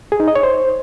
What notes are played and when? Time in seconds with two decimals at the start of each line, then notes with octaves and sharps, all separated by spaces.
0.12 G#4
0.20 D#4
0.28 D#5
0.35 C#5
0.43 C5